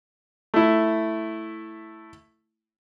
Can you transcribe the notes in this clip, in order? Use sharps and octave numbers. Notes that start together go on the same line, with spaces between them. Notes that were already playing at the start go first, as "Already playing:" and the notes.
A3 E4